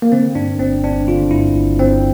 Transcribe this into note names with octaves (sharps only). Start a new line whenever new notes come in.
A#3
D3 C4
G2 D4
G1 C4
G1 D4
D3 F4
G2 E4
G1
G1 C4